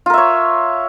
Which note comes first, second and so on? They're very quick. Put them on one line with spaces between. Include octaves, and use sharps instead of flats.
F4 A#4 E5 C#5